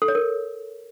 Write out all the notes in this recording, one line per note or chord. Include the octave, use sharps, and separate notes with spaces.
A4
C#5
A#4